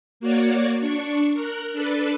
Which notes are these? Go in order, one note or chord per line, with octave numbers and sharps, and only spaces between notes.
A#3 F#4 C#5 D5
D4 C#6
A#4 F#6
D4 A4 B4